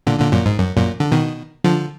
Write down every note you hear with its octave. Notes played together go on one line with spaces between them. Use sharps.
A#2 D3
A#2 D3
F#2 A#2
G#2
F#2
F#2 A#2
D3
B2 D#3
D3 F3